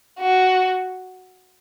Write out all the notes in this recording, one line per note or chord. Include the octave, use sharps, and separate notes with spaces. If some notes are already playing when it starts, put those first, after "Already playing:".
F#4